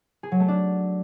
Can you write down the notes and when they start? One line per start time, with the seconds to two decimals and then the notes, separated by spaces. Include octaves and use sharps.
0.23 G#4
0.32 F#3
0.40 A3
0.48 D4